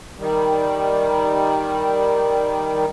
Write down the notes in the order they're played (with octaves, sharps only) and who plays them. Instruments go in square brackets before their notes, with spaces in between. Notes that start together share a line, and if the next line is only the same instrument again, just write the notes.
[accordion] D#3 G3